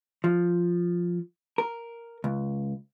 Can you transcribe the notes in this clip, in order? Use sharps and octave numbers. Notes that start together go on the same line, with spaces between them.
F3
A#4
C#2